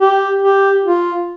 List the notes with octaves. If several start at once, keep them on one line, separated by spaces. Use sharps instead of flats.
G4
G4
F4